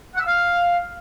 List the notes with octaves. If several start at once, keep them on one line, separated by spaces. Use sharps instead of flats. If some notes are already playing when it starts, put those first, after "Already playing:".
F#5
E6
F5